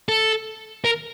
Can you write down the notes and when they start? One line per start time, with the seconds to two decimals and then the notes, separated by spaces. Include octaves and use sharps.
0.09 A4
0.85 A#4